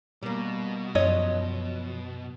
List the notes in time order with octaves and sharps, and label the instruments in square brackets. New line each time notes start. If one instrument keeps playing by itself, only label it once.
[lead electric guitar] B2 [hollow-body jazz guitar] G3 A#3
[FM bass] F#2 [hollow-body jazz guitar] F3 F#3 [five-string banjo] C#5 D#5